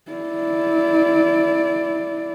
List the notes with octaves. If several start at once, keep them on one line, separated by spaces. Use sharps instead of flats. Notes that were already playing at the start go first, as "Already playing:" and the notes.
E4 D5